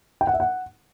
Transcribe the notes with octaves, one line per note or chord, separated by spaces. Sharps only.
G5
F#5
E5
F#5